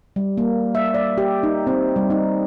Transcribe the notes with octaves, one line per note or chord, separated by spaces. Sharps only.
G3
A#3
E5
D5
G4
D#4
C4
G3
D#4